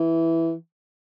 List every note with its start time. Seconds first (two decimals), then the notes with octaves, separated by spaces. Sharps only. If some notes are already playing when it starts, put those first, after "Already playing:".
Already playing: E3